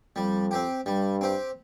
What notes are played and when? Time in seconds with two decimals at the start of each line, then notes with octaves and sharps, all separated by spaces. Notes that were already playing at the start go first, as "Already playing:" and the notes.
0.16 F2 G3
0.51 C4 G4
0.86 G2 G3
1.21 C4 G4